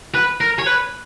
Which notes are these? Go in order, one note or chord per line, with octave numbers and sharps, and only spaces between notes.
B4
A#4
C#5
B4